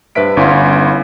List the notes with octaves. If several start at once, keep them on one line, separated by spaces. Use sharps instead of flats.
G2 B4 C5 E5 B6 D7
G1 C#4 E4 F5 C6